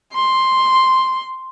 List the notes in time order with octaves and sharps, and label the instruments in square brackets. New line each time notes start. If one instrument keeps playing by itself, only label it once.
[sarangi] C6